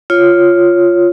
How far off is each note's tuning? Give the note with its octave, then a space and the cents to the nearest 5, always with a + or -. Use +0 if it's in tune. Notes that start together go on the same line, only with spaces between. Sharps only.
F4 +0 C#5 +0